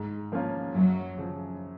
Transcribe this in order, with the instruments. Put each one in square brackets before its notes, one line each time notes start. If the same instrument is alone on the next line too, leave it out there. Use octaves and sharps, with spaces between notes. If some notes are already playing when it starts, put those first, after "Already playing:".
Already playing: [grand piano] G#2
F3 A#3 C#4 F4
[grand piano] F#2 [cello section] F#3
[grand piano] C#3 F3